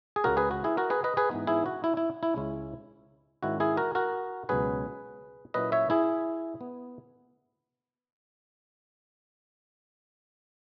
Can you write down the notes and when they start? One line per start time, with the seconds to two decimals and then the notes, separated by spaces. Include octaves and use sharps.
0.16 G#4
0.24 C#2 C#3 G#3 F#4 A#4
0.37 G#4 B4
0.51 F#4
0.64 E4 G#4
0.77 F#4 A#4
0.90 G#4 B4
1.04 B4 D#5
1.17 G#4 B4
1.30 G#2 E3 B3 D#4
1.47 E4 G#4
1.66 F#4
1.84 E4
1.97 E4
2.23 E4
2.36 C#2 C#3 G#3 C#4 E4
3.43 G#2 D#3 G#3 C#4 E4 F#4
3.60 E4 G#4
3.77 F#4 A#4
3.95 F#4 A#4
4.49 C#2 B2 F#3 C#4 G#4 B4
5.54 A#2 F#3 C#4 E4 B4 D#5
5.72 C#5 E5
5.90 E4 G#4
6.61 B3